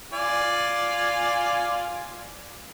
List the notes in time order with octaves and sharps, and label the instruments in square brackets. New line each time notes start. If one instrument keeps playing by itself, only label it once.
[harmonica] F4 D5 G#5